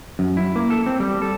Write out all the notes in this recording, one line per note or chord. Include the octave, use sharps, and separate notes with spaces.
F#2
E4
A#3
A4
C4
G3
A4